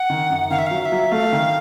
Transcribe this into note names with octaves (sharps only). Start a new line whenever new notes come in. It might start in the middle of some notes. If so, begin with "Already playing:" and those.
Already playing: F#5
D#3
F#2
D#3 F5
E5
F#3 F5
F5
E5
F#3
A3 F5
D#3